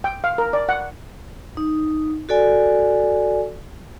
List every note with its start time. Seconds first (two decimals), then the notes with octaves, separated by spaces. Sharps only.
0.04 G5
0.24 F5
0.38 A#4
0.53 D5
0.69 F#5
1.57 D#4
2.29 F#4 A4 D5 G#5